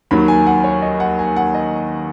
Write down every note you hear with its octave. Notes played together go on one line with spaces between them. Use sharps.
D#2 D#3 F#3 B5
G#5
F#5
C#5
D#5
F#5
G#5
F#5
D#5